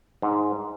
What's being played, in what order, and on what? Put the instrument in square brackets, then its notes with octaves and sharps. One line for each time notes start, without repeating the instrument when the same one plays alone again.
[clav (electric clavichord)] G#2